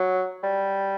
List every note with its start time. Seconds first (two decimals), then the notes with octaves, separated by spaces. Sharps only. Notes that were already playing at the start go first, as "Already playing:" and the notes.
Already playing: F#3
0.43 G3